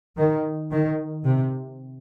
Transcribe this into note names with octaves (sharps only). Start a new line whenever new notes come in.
D#3
D#3
C3